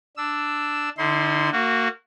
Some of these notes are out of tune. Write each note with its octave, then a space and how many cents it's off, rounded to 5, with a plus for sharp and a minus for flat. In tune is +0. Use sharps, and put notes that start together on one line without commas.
D4 +0 E6 +0
D3 +20 E4 -40 C6 -5
A#3 -25 F#4 -5